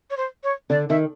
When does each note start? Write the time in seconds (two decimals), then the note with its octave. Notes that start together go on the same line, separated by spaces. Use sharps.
0.10 C#5
0.17 C5
0.44 C#5
0.70 D3 D5
0.90 D#3 E5